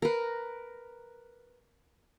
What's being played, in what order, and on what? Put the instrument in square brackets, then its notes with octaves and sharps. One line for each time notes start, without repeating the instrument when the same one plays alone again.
[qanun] A#4 B4